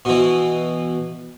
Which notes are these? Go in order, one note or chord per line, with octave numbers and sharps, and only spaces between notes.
B2 E3